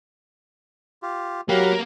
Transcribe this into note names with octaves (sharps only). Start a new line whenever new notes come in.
F4 G4
F#3 A#3 G4 F5 F#5 B5